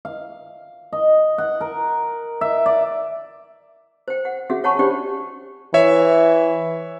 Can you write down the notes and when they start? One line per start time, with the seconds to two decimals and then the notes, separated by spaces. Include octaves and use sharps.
0.05 F5
0.93 D#5
1.38 F#5
1.61 A#4
2.41 E5
2.66 D5
4.08 C5 G5
4.25 F#5
4.50 C#4 F#4 G#4 E5 F#5
4.64 C#5 F#5 G#5 A5 B5 C#6
4.79 C#4 D4 G4 C5 D5 G5
5.74 E3 C#5 E5